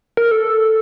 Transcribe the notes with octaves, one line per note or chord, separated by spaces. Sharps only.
A#4
A4